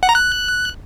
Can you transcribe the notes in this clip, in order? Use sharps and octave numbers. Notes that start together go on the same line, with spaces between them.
F#5
A#5
F#6